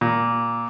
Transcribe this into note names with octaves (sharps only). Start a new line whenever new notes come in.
A#2